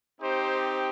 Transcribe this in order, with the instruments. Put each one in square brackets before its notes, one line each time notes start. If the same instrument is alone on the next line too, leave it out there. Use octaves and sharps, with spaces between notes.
[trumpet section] C4 D#4 G4 C5